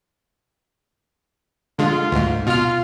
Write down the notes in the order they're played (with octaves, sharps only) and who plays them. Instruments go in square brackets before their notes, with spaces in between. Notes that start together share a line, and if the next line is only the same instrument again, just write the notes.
[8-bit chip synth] D3 G#3 [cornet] F4
[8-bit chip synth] D2 G#2
[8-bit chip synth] B2 F6 [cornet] F4